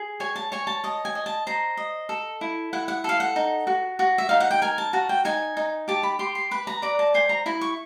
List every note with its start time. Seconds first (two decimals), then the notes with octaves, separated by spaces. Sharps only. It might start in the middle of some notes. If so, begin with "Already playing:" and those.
Already playing: G#4
0.20 C#5 G#5
0.36 A5
0.52 C#5 G#5
0.67 A5
0.84 D#5 A5
1.05 G#5
1.15 D#5
1.26 A5
1.47 C5 A#5
1.77 D#5
2.09 A4
2.41 E4
2.73 E4 F#5
2.88 F#5
3.04 A4 F5
3.20 F#5
3.36 D#4
3.67 F#4
3.99 F#4
4.18 E5
4.29 D#4 F5
4.40 F#5
4.51 G5
4.62 A#4 G#5
4.78 A5
4.93 F#4 A5
5.09 G5
5.25 D#4 G#5
5.57 D#4
5.88 G4 A5
6.03 B5
6.19 G4 C6
6.35 C6
6.51 B4 B5
6.67 A#5
6.82 D5 A#5
6.99 A5
7.14 C5 G#5
7.29 A#5
7.46 E4 B5
7.61 C#6